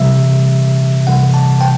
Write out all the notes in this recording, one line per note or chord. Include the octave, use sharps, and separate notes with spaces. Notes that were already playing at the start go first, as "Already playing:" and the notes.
Already playing: C3 E3 G3 E5
C3 E3 G3 F#5
A5
G5